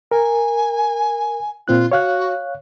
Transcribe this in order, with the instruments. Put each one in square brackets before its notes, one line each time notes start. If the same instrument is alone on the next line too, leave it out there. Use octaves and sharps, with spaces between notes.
[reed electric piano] A#4 [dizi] G#5
[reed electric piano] A#2 C4 F#6 [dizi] F4
[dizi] F#4 [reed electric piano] C#5 F5 F#6